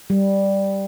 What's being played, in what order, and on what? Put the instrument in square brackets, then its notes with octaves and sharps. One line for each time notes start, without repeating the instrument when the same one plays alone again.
[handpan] G3